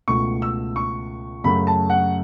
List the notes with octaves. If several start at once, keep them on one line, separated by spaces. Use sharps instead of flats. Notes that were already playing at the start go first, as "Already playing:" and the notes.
C#2 B2 A3 C#6
E6
C#6
F#2 C#3 F#3 A3 B5
A5
F#5